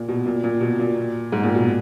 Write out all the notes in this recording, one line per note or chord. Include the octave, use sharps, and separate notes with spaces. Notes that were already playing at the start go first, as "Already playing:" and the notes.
Already playing: A#2
B2
A#2
A#2
B2
A#2
G#2
A#2
B2